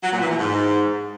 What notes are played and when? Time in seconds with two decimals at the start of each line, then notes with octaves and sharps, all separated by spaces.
0.03 F#3
0.12 A#2
0.21 E3
0.30 B2
0.38 G#2